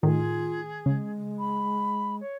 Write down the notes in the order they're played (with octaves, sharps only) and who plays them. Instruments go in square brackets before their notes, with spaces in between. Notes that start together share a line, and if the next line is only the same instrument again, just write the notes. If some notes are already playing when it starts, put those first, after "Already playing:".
[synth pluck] A2 D#3 [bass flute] F4 [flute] G#4
[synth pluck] C#3 [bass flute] G#3
[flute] B5
C#5